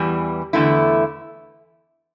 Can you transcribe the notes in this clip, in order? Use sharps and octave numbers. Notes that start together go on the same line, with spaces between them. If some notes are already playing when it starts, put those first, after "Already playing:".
Already playing: E2 E3 G3
E2 D3 A3 E4